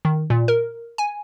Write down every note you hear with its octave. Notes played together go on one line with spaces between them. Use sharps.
D#3
A#2
A#4
G#5